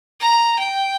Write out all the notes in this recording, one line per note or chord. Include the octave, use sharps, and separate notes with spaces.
A#5
G5